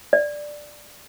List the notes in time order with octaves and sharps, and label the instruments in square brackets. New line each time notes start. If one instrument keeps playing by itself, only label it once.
[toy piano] D5